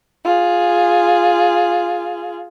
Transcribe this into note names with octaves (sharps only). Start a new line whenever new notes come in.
F4 G#4